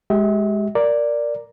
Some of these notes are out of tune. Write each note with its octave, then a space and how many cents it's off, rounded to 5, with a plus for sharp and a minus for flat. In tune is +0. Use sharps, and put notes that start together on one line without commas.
G#3 +0 G4 -25 E5 -40
A#4 +0 D5 +0